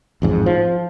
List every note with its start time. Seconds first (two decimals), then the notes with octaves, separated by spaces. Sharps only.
0.22 A1 F2 G#2
0.46 F3